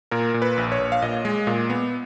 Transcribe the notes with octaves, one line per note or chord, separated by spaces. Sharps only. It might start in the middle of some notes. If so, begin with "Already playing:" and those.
A#2 A#4
A#2
B4
A#1
C#5
A#1
F5
A#2 D#5
G#3
A#2
B3